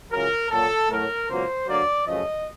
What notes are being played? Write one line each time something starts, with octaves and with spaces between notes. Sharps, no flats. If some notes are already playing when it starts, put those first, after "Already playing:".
C#2 C#3 F#3 A#4
A#2 F#3 A#3 A4
A2 F#3 A3 A#4
C#2 B2 F#3 A#3 C5
D2 D3 F#3 A#3 D5
F#2 C#3 F3 A3 D#5